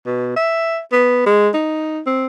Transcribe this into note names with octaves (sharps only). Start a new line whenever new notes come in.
B2
E5
B3
G#3
D#4
C4